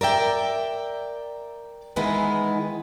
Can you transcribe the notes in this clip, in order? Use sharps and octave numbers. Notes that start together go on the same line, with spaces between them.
A#4 D5 E5 G5
D#3 E3 G#3 B3 E4